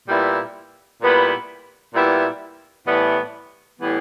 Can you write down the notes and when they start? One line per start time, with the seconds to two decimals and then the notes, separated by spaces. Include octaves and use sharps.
0.08 A#2 G3 B3 E4
1.02 A#2 G3 B3 E4
1.94 A#2 G3 B3 E4
2.86 A2 E3 G3 B3
3.80 A2 E3 G3 B3